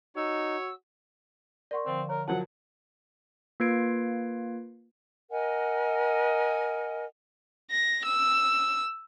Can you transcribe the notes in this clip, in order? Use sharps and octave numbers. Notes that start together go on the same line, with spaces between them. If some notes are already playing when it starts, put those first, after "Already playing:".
D#4 F#4 C#5 E6
A#4 D5 F#5 C6 C#6
D3 F3 C4
A#4 C#5
F3 F#3 A#4 F#5 A5
A#3 F4 B4 G#6 C7 D7
A#4 D#5 F#5 G#5
A#6
E6